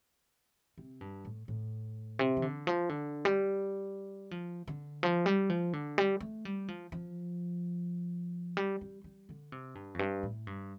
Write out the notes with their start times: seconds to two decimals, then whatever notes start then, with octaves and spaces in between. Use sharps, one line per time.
0.78 C3
1.01 G2
1.25 A2
1.48 A2
2.19 C3
2.37 F3
2.42 D3
2.67 F3
2.89 D3
3.25 G3
4.31 F3
4.67 D3
5.03 F3
5.26 G3
5.50 F3
5.73 D3
5.98 G3
6.20 A3
6.45 G3
6.68 F3
6.92 F3
8.57 G3
8.81 G3
9.04 G3
9.29 D3
9.52 C3
9.75 G2
9.94 F2
9.99 G2
10.23 A2
10.47 G2